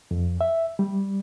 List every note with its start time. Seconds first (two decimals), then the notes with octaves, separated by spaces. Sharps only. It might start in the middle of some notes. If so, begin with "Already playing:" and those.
0.11 F2
0.41 E5
0.79 G3